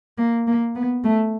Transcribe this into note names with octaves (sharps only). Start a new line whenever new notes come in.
A#3
A#3
B3
A3